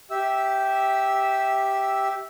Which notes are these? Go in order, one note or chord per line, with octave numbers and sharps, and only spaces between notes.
G4 E5 E6